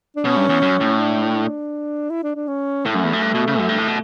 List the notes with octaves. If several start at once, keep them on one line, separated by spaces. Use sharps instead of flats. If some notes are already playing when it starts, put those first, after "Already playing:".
D4
B2 C#4
G2
E2
F#2
A2
D4
E4
D4
D4
C#4
A2 A3
F#2
E2
F#2
G2
B2
C#3
F#2
G2
A2
B2